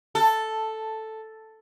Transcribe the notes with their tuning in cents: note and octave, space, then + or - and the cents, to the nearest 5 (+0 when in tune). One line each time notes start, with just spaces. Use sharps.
A4 +0